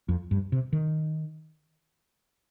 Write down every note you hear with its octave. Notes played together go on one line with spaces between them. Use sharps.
F2
G2
C3
D#3